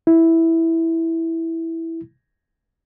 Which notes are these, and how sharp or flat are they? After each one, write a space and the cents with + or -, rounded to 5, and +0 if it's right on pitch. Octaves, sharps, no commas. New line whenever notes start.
E4 -5